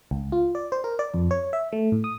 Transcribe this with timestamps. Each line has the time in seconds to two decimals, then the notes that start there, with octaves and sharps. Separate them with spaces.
0.11 C#2
0.32 F4
0.55 D5
0.72 C5
0.84 A#4
0.99 D5
1.14 F2
1.31 C#5
1.53 E5
1.73 A3
1.92 A2
2.04 D#6